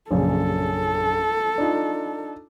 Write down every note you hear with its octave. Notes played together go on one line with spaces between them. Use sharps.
A#1 F#2 C#3 A4
D4 D#4 F4